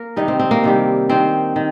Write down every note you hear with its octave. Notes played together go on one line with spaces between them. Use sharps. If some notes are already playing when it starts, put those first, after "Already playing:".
Already playing: A#3 A#4
C3 D#3 G3 D#4
C4
C4
A#3
C3 D#3 G3
D#3 A#3 C4
D#3